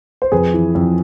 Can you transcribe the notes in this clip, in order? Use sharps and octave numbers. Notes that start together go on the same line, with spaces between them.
C5
F2 G#4 B4
E3
F2